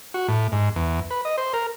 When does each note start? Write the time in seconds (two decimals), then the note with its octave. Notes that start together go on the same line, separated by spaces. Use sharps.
0.14 F#4
0.28 A2
0.52 G#2
0.76 E2
1.11 B4
1.25 D#5
1.38 C5
1.53 A#4